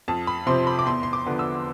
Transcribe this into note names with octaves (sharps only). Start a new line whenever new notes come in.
F2 A5
B5
C3 F3 C4 C6
B5
D6
E2 C6
C6
D6
D3 F3 B3
E6